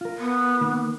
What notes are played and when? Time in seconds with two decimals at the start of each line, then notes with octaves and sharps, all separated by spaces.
0.01 F4 A#4
0.18 B3
0.61 D#3 A#3